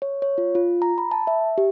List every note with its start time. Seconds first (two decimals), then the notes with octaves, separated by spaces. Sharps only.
0.02 C#5
0.22 C#5
0.38 F4
0.55 F4
0.82 A#5
0.98 B5
1.11 A5
1.27 E5
1.58 G4